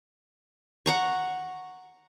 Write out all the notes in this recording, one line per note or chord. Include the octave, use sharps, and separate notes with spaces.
F#5 A#5 C#6